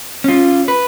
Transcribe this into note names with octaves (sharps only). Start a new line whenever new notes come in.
C#4 F4
B4